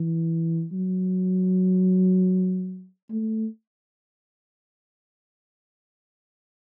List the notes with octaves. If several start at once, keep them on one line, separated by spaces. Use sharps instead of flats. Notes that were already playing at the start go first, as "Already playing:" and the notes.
Already playing: E3
F#3
A3